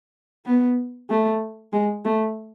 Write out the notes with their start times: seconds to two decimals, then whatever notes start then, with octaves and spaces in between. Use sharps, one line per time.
0.45 B3
1.10 A3
1.73 G#3
2.05 A3